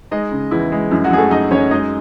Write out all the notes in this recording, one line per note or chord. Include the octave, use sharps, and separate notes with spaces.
G#3 D#4 D#5
C#3
E2 E4
G#3
F#2 E4
F#3 F#4
F#2 G#4
A3 A4
F#2 D#4 D#5
F#2 C#4 C#5
G#3 D#4 D#5